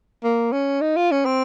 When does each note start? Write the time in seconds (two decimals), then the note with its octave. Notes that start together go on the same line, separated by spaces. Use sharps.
0.24 A#3
0.52 C#4
0.81 D#4
0.96 F4
1.11 C#4
1.25 C4